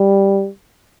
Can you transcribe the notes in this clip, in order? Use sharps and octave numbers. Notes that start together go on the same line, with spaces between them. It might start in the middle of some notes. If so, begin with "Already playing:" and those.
Already playing: G3